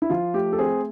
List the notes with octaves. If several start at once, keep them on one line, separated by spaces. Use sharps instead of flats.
E4
F3 F4
A3 G4
A4
C4 G#4